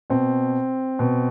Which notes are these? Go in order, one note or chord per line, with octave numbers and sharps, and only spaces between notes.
B2 C4
B2